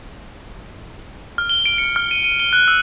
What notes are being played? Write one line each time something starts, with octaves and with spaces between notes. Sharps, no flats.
F6
G7
D7
C#7
F6
D#7
D#7
G7
F#6
E6